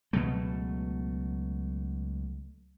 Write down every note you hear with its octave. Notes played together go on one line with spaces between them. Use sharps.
C#2 B2 F#3 A3